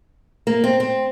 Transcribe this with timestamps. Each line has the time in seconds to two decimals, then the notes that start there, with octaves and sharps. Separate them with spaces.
0.47 A#3
0.64 C4
0.80 C4